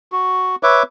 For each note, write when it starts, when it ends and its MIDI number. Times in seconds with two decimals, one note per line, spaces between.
0.12 0.56 66
0.63 0.83 71
0.63 0.83 73
0.63 0.83 76
0.63 0.83 86